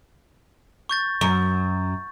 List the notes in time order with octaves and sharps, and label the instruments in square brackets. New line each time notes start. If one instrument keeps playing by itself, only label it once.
[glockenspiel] C#6 G6 A6
[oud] F#2 [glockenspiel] C#6